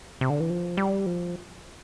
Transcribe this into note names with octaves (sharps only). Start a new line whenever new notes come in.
C3
D3
E3
F3
G3
F3